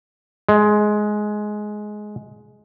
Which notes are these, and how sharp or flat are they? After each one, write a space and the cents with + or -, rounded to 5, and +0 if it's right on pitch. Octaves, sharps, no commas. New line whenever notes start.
G#3 +15